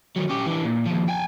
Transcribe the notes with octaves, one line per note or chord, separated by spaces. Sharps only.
D#3 F#3
C#4 G4
E3 D4
A#2
D#2 F3
G5 G#5